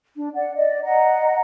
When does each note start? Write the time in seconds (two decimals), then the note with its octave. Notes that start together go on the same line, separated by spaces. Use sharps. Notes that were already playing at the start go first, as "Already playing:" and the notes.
0.16 D4
0.35 D5 F#5
0.56 D5 D#5
0.84 D#5 F#5 A#5